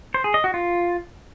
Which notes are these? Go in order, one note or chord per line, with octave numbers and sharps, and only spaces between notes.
C5
G#4
D#5
F#4
F4